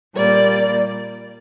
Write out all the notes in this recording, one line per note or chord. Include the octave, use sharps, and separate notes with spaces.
A#2 G3 A#3 D5